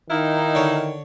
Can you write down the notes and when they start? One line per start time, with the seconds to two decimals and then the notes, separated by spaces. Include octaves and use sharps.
0.10 D#3 D#4 E4 F5
0.55 D3 C#5